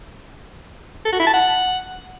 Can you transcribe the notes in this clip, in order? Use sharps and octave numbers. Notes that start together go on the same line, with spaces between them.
A4
F#4
E4
A5
F#5